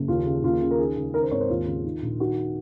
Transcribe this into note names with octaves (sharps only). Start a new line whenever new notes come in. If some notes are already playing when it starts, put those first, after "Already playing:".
Already playing: F#1
D#2 F4
C#3
D#2 F4
C#3
A#4
D#3 G#4
C#2
D#3 A#4
C5
G#1 C#5
C5
D#2 F4
C#3
D#3
A#1
D#3 F#4